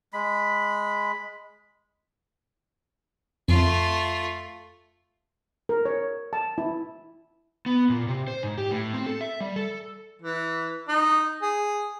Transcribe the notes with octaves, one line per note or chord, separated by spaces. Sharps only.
G#3 B5
F2 A3 F4
A#4
C#5
A5
E4
B3
A#2
C3
C5
G#2
G4
A2
C4
A4
E5
G3
A4
E3
D#4
G#4